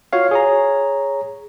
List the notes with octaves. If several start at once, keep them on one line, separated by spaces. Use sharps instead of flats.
F4 F#4 C#5 F5
G#4 C#5 A#5